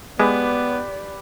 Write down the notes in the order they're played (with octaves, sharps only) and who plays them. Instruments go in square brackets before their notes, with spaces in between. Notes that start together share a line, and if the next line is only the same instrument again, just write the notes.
[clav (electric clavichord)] G#3 [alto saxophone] B3 [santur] G4 B4 [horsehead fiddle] D5